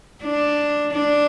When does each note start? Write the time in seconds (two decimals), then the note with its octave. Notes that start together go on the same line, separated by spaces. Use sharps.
0.23 D4
0.93 D4